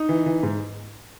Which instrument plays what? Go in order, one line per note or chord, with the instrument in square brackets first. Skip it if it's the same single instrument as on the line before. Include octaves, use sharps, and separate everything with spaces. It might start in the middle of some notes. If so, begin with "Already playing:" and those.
Already playing: [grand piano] D#4
E3
E3
G#2